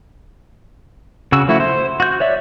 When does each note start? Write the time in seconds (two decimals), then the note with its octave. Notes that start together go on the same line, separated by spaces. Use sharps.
1.32 C#3 F#4 E6
1.48 F3 A3 E4 F#4
1.60 C5
2.00 F#4 G6
2.20 C#5 D5 E5